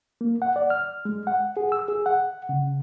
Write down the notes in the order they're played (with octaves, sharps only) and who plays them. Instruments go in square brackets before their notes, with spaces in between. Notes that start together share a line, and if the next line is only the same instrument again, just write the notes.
[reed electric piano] A#3
F#5
D5
F6
G#3
F#5
G#4
E6
G#4
F#5
C#3